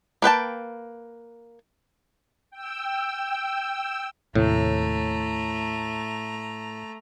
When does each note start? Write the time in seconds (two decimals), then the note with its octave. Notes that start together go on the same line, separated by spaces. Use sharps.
0.22 A#3 B4 G5 A5
2.51 G5 E6
4.35 D#2 A2 C3 A3 A#5